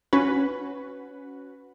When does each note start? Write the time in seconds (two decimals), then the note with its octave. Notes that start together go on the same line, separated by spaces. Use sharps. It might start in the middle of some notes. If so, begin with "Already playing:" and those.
0.13 C#4 F#4 B4